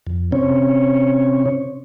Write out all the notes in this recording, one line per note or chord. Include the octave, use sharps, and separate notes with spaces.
F2
C3 C4 C#4 C#5